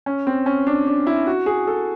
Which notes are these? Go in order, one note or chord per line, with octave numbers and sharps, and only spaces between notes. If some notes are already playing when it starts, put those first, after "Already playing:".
C#4
C4
C#4
D4
D4
E4
F#4
G#4
A4